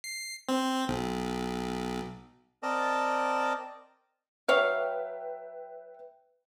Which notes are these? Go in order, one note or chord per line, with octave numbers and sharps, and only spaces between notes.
C7
C4
B1
C4 A#4 D5 D#5 A5
F#3 B4 C#5 E5 F5 G5